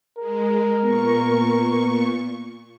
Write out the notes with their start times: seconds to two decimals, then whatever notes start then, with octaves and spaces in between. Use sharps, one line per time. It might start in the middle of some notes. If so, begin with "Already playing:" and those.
0.18 G#3 A#4
0.84 A#2 B3 C#6